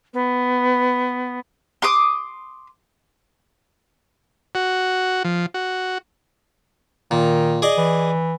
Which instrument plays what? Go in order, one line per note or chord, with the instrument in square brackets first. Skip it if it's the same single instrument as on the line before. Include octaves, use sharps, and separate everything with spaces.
[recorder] B3
[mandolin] C6 D6 D#6
[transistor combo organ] F#4
F3
F#4
[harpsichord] A#2 [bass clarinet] D#3
[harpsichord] G#4 D5 D#5
[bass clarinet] E3